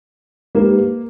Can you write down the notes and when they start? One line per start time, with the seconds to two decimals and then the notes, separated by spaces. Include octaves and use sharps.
0.55 G#3 A#3 D#4 G4 B4